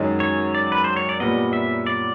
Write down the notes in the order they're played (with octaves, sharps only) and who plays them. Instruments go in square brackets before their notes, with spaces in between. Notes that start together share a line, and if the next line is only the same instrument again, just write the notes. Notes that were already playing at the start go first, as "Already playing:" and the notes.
Already playing: [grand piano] F#2 D#3 G#3 C#4
[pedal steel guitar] C#5
D5
B4
C5
C#5
D5
[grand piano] A#2 G3 B3 [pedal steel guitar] D#5
[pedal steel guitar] E5
D5